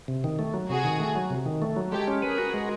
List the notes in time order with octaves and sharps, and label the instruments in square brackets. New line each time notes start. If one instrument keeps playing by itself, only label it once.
[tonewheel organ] C3
D#3
A3
F#3
[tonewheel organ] C3 [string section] F#4 G#4
[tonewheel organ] D#3
A3
F#3
C3
D#3
A3
F#3
[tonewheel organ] G#3 [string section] G4 A4
[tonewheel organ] C#4
[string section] G#4 A#4 [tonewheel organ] B4
[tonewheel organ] F#4
G#3